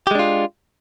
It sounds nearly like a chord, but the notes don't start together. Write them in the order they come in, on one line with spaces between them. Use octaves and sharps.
G4 G#3 D4 F4